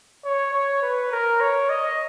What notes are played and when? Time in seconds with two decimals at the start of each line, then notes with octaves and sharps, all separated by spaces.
0.25 C#5
0.54 C#5
0.82 B4
1.12 A#4
1.40 C#5
1.70 D#5